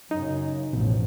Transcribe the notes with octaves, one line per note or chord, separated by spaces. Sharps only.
F#2 C#3 D#4
A1 F2 B2